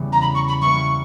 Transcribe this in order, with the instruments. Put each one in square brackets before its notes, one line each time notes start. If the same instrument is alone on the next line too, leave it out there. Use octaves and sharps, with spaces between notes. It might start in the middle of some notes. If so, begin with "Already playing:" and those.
Already playing: [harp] E2 C#3 E3 G3 B3
[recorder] A#5
B5
C#6
B5
[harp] G3 A#3 E4 B4 [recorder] C#6